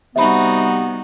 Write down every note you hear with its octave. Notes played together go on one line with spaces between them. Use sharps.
C3 G3 B3 D#4 F#4 E5 B5